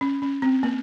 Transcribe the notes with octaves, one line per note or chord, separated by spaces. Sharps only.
C#4
C#4
C4
A#3